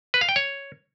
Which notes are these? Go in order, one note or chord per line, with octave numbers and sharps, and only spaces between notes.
B4
F5
G5
C#5